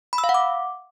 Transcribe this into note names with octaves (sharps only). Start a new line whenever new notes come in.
B5
E6
F5
F#5
D6